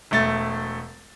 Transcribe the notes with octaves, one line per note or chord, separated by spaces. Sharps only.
E1 A3 A6